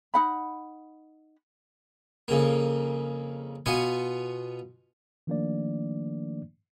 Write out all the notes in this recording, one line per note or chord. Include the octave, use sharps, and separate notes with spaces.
D#4 F#5 B5
F2 C#3 A#3
B2 B3 F4 G#5 C#6
D#3 F3 A3 A#3 D4 D5